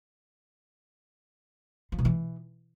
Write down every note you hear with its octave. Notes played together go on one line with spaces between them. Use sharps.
F3
B2
E3